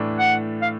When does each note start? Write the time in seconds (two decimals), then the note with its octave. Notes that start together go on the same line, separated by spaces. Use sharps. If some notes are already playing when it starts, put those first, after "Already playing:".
Already playing: A2 E3 A3 D4
0.19 F#5
0.62 F5